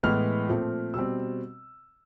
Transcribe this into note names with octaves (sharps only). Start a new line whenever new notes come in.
A2 E3 G#3 B3 F6
A#2 F3 A3 C4
B2 G3 C4 E6